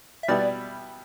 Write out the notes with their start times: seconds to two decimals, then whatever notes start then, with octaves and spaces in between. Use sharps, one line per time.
0.23 E5
0.28 B2 G3 B3 E4 D5